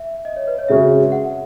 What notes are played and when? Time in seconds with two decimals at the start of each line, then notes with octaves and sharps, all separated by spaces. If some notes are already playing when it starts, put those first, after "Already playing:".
Already playing: E5
0.25 D#5
0.36 C#5
0.48 B4
0.59 C#5
0.68 C#3 G#3 C#4 F#4 E5
1.12 F#5